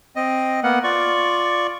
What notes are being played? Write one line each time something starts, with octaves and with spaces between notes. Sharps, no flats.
C4 D#5
A#3 B3 F#5
F4 D5 C#6